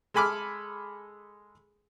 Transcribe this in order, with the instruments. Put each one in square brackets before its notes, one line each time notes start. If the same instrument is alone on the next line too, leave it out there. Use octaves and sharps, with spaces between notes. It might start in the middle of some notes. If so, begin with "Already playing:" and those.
[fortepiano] G#3 A4 G#5 B5 D6 F6